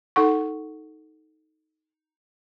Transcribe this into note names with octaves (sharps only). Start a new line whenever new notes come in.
D#4 A4 F#5 C#6